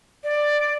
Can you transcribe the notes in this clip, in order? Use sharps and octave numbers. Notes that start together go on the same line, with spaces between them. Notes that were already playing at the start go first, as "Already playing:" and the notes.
D5